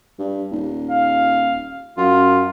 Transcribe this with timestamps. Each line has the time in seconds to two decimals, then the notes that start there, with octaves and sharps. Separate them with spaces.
0.19 G2
0.51 D#1
0.90 F5
1.98 F#2 F4